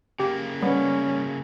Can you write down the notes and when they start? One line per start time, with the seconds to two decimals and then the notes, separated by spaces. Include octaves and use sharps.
0.20 C#3 A#3 G4
0.62 G3 B3 C#4